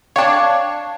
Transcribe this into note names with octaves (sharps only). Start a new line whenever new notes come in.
D4 C#5 F5 G5 A5